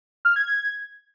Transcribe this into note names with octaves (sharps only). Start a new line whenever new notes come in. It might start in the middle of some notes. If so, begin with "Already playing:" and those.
F6
G#6
G#6